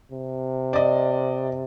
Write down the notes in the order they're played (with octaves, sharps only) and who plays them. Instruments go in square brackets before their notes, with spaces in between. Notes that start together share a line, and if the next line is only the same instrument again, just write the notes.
[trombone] C3
[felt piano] D5 D#5